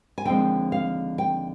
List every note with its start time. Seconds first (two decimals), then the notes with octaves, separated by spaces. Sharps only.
0.18 G#5
0.25 D#2 D3 F3 G#3 C4 G5
0.72 F5
1.18 G5